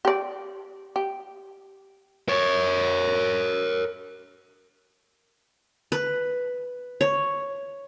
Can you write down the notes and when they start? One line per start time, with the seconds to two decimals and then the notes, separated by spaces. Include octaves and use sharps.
0.05 G4 D5
0.96 G4
2.28 A#4 C#5
5.92 B4
7.01 C#5